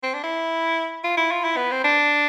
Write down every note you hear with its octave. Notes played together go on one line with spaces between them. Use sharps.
C4
D4
E4
F4
E4
F4
E4
B3
C4
D4